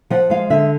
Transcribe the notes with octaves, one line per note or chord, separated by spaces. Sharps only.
F3 F#5
G#3 F5
D3 E5